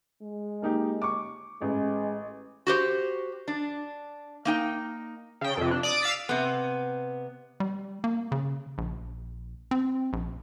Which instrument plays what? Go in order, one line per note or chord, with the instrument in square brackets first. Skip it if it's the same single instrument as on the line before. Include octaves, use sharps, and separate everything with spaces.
[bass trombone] G#3
[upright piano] A#3 D#4 G4
C#6 D6
[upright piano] A1 [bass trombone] G#3
[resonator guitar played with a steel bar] F#4 G4 C5
D4
A#3 D#4 G5
[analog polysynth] C#3 G5
F2 C3
D4
D5 D6 D#6
F5 E6 B6
[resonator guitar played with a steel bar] C3 B3
[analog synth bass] G3
A#3
C#3
A#1
C4
A#1